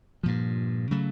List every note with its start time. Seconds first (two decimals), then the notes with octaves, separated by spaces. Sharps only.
0.23 G2 A#2 F3
0.91 C#3 F#3 A3